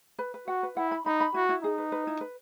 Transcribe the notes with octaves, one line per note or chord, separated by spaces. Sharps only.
B4
B4
F#4 F#5
B4
E4 F#5
B5
D#4 B5
B5
E4 F#4
E4
D#4 G#4
B4
B4
E4
B4